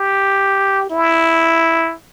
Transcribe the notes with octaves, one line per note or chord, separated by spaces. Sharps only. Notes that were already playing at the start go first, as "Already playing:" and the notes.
Already playing: G4
E4